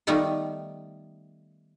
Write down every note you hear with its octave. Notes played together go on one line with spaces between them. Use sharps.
D#3 G3 A3 B3 D#4 F4